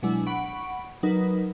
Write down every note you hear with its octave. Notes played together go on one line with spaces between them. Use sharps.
B2 F#3 G#3 D4 E4
F#5 B5 C#6 D7
F#3 D#4 A#4 B4